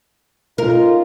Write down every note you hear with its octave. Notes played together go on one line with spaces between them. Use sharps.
C#4 D#4 F4 A#4